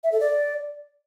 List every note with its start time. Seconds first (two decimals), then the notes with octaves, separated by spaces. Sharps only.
0.04 E5
0.12 A4
0.20 D5